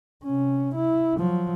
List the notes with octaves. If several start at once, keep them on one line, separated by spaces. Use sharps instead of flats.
C3 C#4
E4
F3 F#3